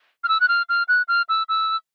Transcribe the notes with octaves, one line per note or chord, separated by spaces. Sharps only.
F6
E6
F#6
F6
F6
F#6
F6
E6
E6